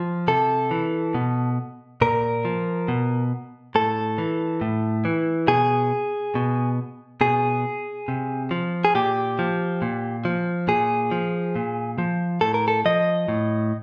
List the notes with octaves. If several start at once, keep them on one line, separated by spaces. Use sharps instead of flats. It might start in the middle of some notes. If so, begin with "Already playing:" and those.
Already playing: F3
C3 A4
E3
B2
A#2 A#4
F3
B2
A2 A4
E3
A2
E3
B2 G#4
B2
B2 G#4
C3
F3
G#4
A#2 G4
F3
A#2
F3
A#2 G#4
F3
A#2
F3
A2 A4
A#4
A4
F3 D#5
A2